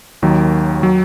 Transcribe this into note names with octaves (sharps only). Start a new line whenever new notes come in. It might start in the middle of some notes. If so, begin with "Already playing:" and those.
D#2 D#3 F#3
F#3